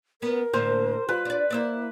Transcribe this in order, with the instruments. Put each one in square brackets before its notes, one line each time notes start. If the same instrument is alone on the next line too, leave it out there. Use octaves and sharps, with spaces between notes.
[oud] B3 C#4 [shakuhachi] A#4
[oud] A2 D3 A#3 [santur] C5
[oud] G3 [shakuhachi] F4 [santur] B4
[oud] D4 D5
[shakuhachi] A#3 [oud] E4 C5 D5